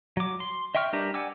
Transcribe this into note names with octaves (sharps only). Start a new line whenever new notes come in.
F#3 D6
C6
D#5 E5 G5 C#6 F6
G3 D4 G4 A#4 B4
D5 F#5 G#5 D6 E6